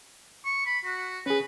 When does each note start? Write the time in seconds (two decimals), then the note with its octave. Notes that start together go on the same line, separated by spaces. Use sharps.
0.45 C#6
0.66 B5
0.84 F#4
1.26 C#4 G#4 B4